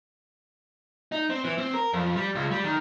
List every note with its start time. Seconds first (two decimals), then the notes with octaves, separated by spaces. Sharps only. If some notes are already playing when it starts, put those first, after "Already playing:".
1.12 D#4
1.30 C4
1.44 E3
1.58 C4
1.74 A#4
1.93 F2
2.16 G3
2.35 C#2
2.51 G3
2.64 D#3